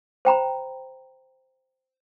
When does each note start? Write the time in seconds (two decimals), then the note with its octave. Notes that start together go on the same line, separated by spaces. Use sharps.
0.25 C5 G5 A#5 B5